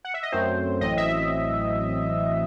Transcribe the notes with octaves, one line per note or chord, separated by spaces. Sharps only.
F#5
E5
D#5
F#2 F#3 A3 C4 C5
A1 A2 F#3 C4 D#5
E5